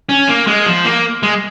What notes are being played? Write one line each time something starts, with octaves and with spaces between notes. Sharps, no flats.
C#4
A#3
G#3
F3
A#3
G#3